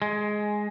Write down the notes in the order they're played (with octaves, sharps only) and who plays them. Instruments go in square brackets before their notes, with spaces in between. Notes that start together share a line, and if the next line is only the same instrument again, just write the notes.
[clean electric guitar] G#3